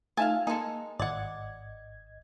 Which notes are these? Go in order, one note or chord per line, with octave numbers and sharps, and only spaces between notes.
A3 D#4 F4 E5 F5 G#5 A5
G#3 A#3 D#4 G#4 A4
G#1 D5 D#5 F#5 G#6